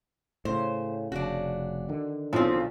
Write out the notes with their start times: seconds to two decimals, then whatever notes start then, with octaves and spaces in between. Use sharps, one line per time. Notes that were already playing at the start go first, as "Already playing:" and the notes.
0.45 A2 C#3 C5
1.12 F1 C#3 D4 F#4
1.89 D3 D#3
2.33 B1 F3 C4 F4